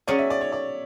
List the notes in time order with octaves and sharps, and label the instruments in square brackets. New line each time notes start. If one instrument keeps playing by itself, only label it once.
[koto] F#3 C#4 G#4 [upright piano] D5
[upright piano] E5
D5
C#5
D5